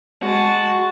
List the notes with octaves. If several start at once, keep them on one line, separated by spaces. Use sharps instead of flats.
G#3 F#4 A5